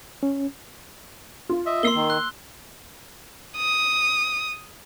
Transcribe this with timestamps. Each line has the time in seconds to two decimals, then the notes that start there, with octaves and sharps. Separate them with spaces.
0.23 C#4
1.49 F4
1.66 D#5 E5
1.83 A#3 C6 E6 C7 G7
1.95 D#3
2.10 F#6
3.57 D#6